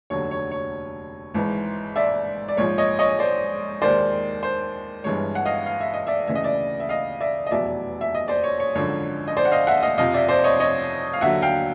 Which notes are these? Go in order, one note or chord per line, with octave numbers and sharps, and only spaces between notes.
F1 D#2 D3 F#3 C#5
C#5
C#5
G#1 G#2 E3
D5 E5
D5
A#1 G#2 F3 C#5
C#5 D#5
C#5 D#5
D#5
C5 D5
D#2 D#3 G#3 C5 D5
C5
G1 G2 E3 G#3 C#5
F#5
D#5 F5
F5
E5
D#5
D5 E5
D2 C#3 E3 E5
D#5
D5 E5
E5
D#5 F5
D5 E5
D#5
F1 E2 B2 F#3 D5 E5
E5
D#5
C5 D5
C#5
C#5
G#1 F#2 D3 F3 C#5
D#5
C5 D5
F#5
D#5 F5
E5 F#5
D#5 F5
F2 C3 F3 D#5 F5
D5 E5
C5 D5
C#5 D#5
C#5 D#5
F5
D#2 D3 F#3 E5 F#5
F5 G5